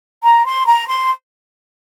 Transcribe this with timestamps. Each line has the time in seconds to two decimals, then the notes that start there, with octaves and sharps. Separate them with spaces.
0.24 A#5
0.45 C6
0.67 A#5
0.88 C6